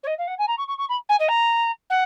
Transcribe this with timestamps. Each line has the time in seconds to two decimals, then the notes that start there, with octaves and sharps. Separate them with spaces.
0.03 C#5
0.07 D#5
0.18 F5
0.27 F#5
0.38 G#5
0.47 A#5
0.58 C#6
0.68 C#6
0.78 C#6
0.89 B5
1.09 G#5
1.19 D#5
1.28 A#5
1.90 F#5